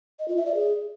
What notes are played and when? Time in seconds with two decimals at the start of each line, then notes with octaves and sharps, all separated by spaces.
0.19 D#5
0.28 F4
0.37 E5
0.46 D5
0.55 G#4